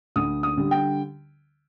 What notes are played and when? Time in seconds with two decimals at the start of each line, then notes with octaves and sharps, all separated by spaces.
0.16 D2 D#6
0.43 D#6
0.57 D3 G3
0.71 G5